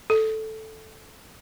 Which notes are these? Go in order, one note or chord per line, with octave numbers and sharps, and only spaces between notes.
A4